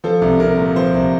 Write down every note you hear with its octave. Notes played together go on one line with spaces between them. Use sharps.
F3 A4
C2
C2 A#4
A#2
F3 C5
C2